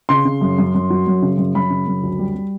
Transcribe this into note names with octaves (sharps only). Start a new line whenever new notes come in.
C#3 C6
C#3
F#2
F#2
F#2
F#3
F#2
C#3
F#2
F#2 B5
C#3
F#2
D2
G3
G3